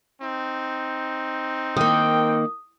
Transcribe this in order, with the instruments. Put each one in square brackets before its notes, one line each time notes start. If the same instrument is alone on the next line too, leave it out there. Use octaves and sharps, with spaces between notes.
[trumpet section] C4 D#4
[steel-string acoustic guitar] D#3 A#3 [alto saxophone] G5 [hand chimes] D#6